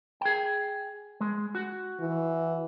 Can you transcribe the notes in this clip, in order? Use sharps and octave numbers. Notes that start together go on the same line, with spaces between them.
G#4 G5
G#3
F#4
E3